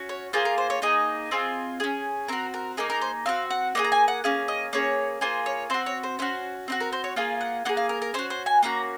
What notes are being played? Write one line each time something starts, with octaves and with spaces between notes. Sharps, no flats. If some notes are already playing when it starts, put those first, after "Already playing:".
Already playing: C#4 F#4
C#5
A#3 F4 G#4 C5
A#4
C5
C#5
A#3 D#4 G#4 D#5
C4 F4 G#4
C#4 G#4
C4 F#4 A#4
A#4
A#3 D#4 G#4 A#4
A#4
C5
C4 F#4 F5
F#5
A#3 D#4 G#4 F#5
A#5
G#5
F#5
A#3 C#4 G#4 F5
D#5
A#3 C#4 G#4 C#5
A#3 F4 G#4 C5
C#5
C4 F#4 C5
C#5
C5
C#4 F#4 C5
C4 D#4 F#4
A#4
C5
C#5
A#3 F4 G#4 F5
F#5
A#3 F4 G#4 F#5
F5
A#4
A#4
C#4 F#4 C5
C5
G#5
A#3 C#4 F#4 A#5